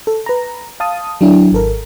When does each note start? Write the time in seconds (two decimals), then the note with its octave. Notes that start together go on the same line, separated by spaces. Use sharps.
0.07 A4
0.26 B4 A#5
0.80 F5 A5 D#6
1.21 F#3 D4 E4
1.52 G#1 A4 A#4